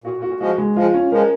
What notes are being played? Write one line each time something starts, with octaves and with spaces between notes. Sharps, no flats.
A#2 F#4
A#2
F#4
A#2
F3 G#3 F#4
G#3
F3 G#3 F4
C#4
F3 G#3 A#4